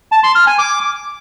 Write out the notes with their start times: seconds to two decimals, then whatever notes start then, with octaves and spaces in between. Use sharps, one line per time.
0.12 A5
0.24 C6
0.35 F6
0.47 G#5
0.59 D6